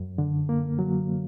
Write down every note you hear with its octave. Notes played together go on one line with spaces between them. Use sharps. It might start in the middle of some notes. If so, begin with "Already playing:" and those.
Already playing: F#2
D3
A#3
F#3